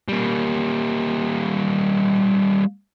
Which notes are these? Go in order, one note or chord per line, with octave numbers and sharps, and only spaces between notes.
G3 A#3